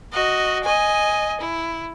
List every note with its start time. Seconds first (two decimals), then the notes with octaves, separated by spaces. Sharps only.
0.12 F#4 D#5
0.64 D#5 G#5
1.41 E4